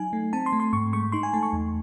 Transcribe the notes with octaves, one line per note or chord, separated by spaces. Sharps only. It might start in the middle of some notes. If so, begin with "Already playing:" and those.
Already playing: F#3 D#4 G#5
A3
C4 A5
C6
A3
C6
G#2 C#6
G#3 C#6
D#4 C6
G#5
A3 A5
C#6
E2